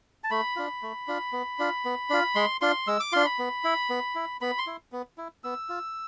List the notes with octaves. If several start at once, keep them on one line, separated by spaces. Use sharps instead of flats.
A5
A3 B5
D4 F4
A3
D4 F4
B3
D4 F4
B3
D4 F4
G#3 C6
D4 F4 C6
G#3 E6
D6
D4 F4 C6
B5
B3
E4
B3
E4
B3 B5
C6
E4
B3
E4
B3 E6
F4